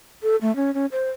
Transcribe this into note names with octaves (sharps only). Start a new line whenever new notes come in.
A4
A3
C#4
C#4
C5